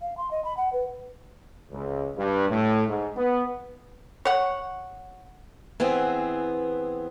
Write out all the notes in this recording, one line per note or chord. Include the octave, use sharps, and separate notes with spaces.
F5
C6
D#5
B5
F#5
B4
C#2
G2
A2
G#2
B3
C#5 F#5
E3 B3 C4 G#4